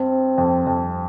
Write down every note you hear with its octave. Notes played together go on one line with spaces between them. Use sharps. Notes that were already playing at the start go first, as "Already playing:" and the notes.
Already playing: G2 C4
F2
F2